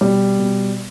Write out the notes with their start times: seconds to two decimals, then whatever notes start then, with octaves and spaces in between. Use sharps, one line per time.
0.01 B2 G3
0.39 B2